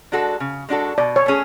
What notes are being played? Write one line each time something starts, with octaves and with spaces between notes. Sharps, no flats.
G#3 D4 F#4 A4
C#3
G#3 D4 F#4 A4
B2 D5
C#5
A3 C#4 G#4